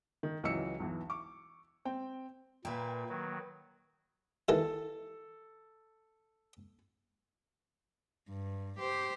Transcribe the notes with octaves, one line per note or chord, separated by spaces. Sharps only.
D#3
C#2 E3 F#3 D#5 E6 C#7
B1 E2 E3
C#6 D6
C4 G5
A#2 A#3 B4 E5 G5
D#3 F#3
D#3 E3 A4
G2
G4 C5